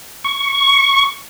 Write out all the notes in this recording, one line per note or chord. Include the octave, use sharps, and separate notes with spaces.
C#6